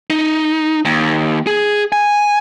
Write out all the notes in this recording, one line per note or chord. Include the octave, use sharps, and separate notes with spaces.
D#4
D#2
G#4
G#5